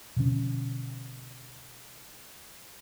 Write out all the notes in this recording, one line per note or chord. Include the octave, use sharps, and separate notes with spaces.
B2 D3 F3 C#4